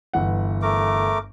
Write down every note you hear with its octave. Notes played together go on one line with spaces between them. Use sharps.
G1 E3 F#5
A3 A#4 D6